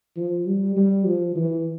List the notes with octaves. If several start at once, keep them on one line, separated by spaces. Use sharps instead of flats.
F3
G3
G3
F3
E3